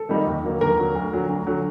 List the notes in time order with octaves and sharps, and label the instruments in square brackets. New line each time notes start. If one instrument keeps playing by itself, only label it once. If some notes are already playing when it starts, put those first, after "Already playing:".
Already playing: [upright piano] A4
[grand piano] D#3 G3 A#3 D#4
D#2
D3 F#3 A#3
[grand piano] D#2 [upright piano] A#4
[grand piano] D3 F#3 A#3
D2
D3 F#3
D2
D3 F#3